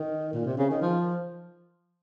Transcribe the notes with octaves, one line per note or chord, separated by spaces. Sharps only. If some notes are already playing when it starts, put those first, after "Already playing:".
Already playing: D#3
A#2
C3
C#3
D#3
F3